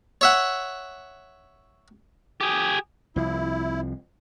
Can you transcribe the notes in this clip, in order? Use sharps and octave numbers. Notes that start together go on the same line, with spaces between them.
C#5 E5 F#5
G4 G#4
C2 F3 E4